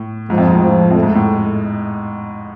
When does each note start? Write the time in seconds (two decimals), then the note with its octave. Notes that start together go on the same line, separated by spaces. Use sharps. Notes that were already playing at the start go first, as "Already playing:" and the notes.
Already playing: A2
0.30 G#2 F3
0.38 F2
0.47 G#2
0.55 A2
0.63 F3
0.91 F2 A3
1.03 G#2
1.15 A2